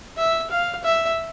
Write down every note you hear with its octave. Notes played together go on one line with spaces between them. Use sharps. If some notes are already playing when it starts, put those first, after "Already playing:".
E5
F5
E5